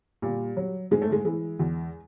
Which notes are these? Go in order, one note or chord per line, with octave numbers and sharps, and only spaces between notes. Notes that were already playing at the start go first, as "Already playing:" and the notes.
A#2 G3
F#3
G#2 G#3
A3
G#3
E3 G#3
E2